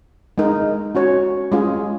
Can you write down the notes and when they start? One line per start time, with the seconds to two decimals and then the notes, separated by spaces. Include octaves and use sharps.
0.38 G#3 D#4 A#4
0.95 C#4 F#4 C#5
1.52 G#3 C#4 F4 G#4